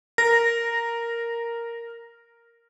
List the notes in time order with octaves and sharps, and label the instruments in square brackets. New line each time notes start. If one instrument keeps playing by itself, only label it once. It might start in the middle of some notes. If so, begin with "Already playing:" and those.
[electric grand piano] A#4 [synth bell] A#6